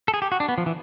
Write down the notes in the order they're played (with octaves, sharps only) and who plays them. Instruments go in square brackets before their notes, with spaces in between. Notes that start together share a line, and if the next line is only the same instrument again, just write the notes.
[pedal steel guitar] A4
G#4
G4
F#4
D4
B3
F3
E3